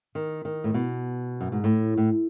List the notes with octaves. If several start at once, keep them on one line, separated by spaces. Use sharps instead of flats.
D#3
D#3
A2
B2
F#2
G#2
A2
A2